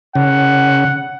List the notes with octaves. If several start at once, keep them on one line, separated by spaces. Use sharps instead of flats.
C#3 F#5